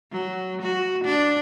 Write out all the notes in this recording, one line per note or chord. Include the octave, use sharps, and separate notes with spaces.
F#3
F#4
D4